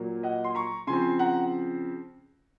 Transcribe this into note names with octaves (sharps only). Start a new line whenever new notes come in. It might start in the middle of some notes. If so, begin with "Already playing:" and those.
Already playing: A#2 F#3 A#3
D#5 F#5
C6
A#5 C#6
C#3 F3 C4 G#5 C6
F#5 A#5